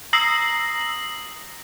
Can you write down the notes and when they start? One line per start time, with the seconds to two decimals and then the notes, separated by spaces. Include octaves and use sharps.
0.13 A#5 D#6 E6 A#6 C7 F#7